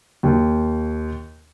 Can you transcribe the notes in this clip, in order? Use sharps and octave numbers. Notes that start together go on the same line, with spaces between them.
D#2